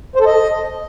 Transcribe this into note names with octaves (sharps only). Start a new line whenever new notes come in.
C5
A4
D#5